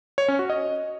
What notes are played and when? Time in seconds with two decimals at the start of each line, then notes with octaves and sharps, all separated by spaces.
0.18 C#5
0.28 C#4
0.39 F#4
0.50 D#5